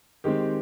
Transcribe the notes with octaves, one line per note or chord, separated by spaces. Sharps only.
D#3 G#3 C4 G4